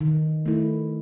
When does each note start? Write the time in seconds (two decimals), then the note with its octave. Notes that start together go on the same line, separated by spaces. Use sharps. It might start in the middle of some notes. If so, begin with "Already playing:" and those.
0.01 D#3
0.46 A3 E4